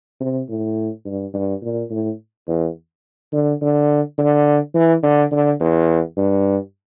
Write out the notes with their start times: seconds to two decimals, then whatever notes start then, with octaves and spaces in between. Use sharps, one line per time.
0.20 C3
0.49 A2
1.05 G2
1.34 G2
1.63 A#2
1.91 A2
2.48 E2
3.33 D3
3.61 D3
4.18 D3
4.74 E3
5.03 D3
5.32 D3
5.60 E2
6.17 G2